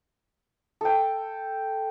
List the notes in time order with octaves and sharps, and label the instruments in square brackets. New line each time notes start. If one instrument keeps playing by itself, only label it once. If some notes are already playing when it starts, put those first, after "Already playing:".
[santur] A4 G5